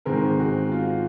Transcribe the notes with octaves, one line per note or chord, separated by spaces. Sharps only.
G#2 D#3 G#3 C4 A#4
F#4
F4